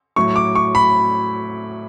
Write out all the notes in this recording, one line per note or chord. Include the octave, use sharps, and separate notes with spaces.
A2 F#3 C#6
D6
C#6
B5